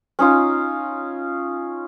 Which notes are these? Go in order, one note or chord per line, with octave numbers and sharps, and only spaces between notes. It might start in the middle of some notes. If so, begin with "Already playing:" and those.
C#4 D#4 F4